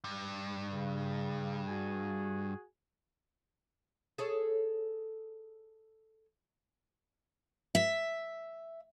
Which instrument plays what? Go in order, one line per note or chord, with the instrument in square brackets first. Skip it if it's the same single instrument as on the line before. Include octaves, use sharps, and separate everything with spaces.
[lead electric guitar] G2
[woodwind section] C#3
F#4 G#4 G#5
[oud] G#4 A4 C#5
[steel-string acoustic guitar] E5